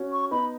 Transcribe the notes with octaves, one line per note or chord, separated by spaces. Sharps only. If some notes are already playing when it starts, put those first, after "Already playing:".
Already playing: C#4 F#4
C#6
B3 D#4 B5